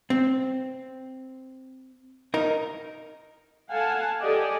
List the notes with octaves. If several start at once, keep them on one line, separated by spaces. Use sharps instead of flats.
C4
D#4 A#4
A4 F5 F#5 G#5 A5
G4 A4 D5 D#5 G#5